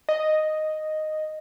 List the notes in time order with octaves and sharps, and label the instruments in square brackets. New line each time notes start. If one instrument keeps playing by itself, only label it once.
[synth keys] D#5